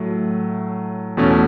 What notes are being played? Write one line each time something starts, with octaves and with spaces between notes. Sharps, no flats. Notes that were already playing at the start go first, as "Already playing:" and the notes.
Already playing: A2 F#3 A3
E2 B2 A3 C#4